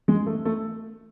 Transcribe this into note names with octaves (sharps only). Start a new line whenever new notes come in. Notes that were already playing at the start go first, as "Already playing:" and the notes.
G#3
A3
A3